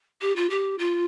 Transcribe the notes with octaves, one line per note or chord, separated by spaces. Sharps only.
G4
F4
G4
F4